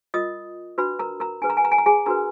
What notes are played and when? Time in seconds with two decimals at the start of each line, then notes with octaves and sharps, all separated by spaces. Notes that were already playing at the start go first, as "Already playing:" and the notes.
0.14 F4 A#4 D#5 D#6
0.78 D4 F#4 B4 B5
0.99 A#4 A#5
1.20 A#4 A#5
1.41 D4 G#4 B4 G#5
1.50 A#5
1.57 G#5
1.65 A#5
1.72 G#5
1.78 A#5
1.86 G#4 G#5
2.06 D4 F#4 A#4 B4 A#5